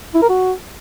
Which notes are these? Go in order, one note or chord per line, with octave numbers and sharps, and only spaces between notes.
E4
A#4
F#4